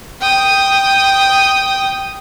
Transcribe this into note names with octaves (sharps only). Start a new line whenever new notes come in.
G5 D#6